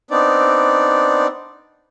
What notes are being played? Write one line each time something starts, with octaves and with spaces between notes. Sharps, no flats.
B3 C4 D4 D#4 D5